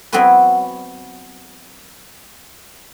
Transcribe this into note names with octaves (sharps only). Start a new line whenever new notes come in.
F#3 B3 C4 E4 F#4 B4